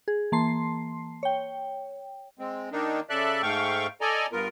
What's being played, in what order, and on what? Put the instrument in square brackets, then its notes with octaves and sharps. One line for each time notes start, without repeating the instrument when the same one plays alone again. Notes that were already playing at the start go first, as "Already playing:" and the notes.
[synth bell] G#4
E3 A#3 A5 C6 C7
C#5 G5
[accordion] G#3 C4
D#3 A#3 D4 D#4
C#3 A4 D5 E5 F#6
G#2 A3 F5 G5 C#6
A4 D5 D#5 G#5 A#5
G2 B3 F4 A#4